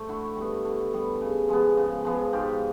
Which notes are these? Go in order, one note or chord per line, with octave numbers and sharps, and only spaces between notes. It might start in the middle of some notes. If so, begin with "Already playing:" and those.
Already playing: A3 C5
D3 E4 F#4
G3 B3
D3
G3 B3
C#3
F3 G#3 B3
C#3
F3 G#3 B3
G#2 F4 G4